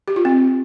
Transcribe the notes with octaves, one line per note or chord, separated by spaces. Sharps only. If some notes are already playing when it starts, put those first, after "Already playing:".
G4
F4
C4